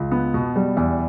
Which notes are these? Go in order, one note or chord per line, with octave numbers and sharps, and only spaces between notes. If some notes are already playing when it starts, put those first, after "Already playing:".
Already playing: C#2
B3
B2
G3
E2